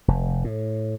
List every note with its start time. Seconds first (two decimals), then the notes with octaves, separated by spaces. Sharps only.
0.08 F1
0.44 A2